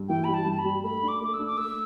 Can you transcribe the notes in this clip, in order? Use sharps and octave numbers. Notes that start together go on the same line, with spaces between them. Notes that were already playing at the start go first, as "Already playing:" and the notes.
Already playing: G2
E3 G5
G3 B5
A5
G2
A5
B5
G3
A3 B5
D4
D6
A3 D6
E6
D4
D6
A3 E6